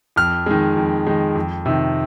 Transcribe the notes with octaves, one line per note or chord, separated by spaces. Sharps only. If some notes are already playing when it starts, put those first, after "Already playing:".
F2 F6
D#3 G#3
F2
D#3 G#3
F2
C3 D#3